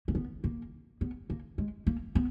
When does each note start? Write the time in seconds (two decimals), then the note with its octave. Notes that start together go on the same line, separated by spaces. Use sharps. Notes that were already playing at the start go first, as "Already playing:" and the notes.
0.08 A#3
0.15 B3
0.44 A#3
1.01 B3
1.30 A#3
1.58 G#3
1.87 A#3
2.15 B3